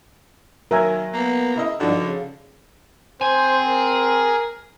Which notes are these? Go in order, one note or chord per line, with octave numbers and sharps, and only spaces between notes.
D#3 F#3 A#4 E5 G#5
A#3 B3
C#3 E4 D#5
G2 D3 F3 D4 D#4 F#4
C#3
C4 G#4 C5 G#5
A#4